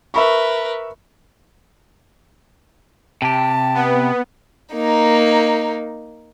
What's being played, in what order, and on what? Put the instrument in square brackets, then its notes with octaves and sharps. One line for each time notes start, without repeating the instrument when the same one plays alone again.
[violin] A#4 B4 [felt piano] E5 B5 C#6
[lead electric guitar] C3 G4 [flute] A5
[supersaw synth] B3
[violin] A#3 D#4